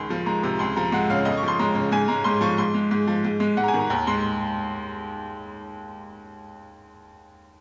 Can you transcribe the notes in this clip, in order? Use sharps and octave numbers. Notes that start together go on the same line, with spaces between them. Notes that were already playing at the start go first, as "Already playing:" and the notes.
Already playing: C#2 D#3 C6
F3
G#3 A#5
C3 A#5
C#2 C6
F3 A#5
G#3 F#5
C#3 F5
F2 D#5
C#6
F3 C6
G#3 A#5
C#3
G#2 G#5
G#3 A#5
G#2 C6
F3 C#6
G#2 C6
G#3
G#2
F3
G#2
G#3
G#2 F#5
A#5
G#5
D#3
A#5
D#2 A#5
G#3 C6